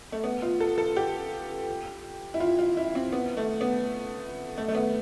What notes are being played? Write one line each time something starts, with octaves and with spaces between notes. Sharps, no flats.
A3
B3
F4
A4
A4
G4
E4
F4
F4
E4
C4
B3
A3
B3
A3
A3
B3